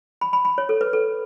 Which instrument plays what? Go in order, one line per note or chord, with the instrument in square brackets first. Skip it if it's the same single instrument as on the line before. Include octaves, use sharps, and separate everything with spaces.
[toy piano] B5
B5
B5
C#5
A4
B4
A4